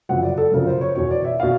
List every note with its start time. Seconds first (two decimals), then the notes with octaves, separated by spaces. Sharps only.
0.09 F#2 C#3 F3 F#5
0.23 D5
0.38 A4
0.52 F#2 C#3 F3 A#4
0.67 C5
0.81 C#5
0.95 E2 B2 C#5
1.11 D5
1.25 E5
1.40 B2 F5